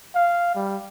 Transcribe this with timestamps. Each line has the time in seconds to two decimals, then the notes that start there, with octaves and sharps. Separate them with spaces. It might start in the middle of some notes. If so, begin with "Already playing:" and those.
0.15 F5
0.55 G3